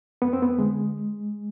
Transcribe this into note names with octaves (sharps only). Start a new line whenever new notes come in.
F2 B3
C4
B3
D3 G#3